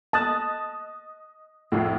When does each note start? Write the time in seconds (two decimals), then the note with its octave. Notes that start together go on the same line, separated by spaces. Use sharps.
0.13 D#5 A5 D#6 F#6
1.72 C2 F2 A2